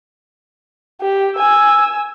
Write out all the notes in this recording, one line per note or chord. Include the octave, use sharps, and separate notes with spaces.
G4
G#5 E6